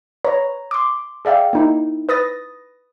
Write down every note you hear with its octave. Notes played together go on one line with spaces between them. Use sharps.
B4 C#5 A#5
C6 D6
G#4 D5 E5 F5 G5
A#3 D#4 E4
B4 D#6 A6 A#6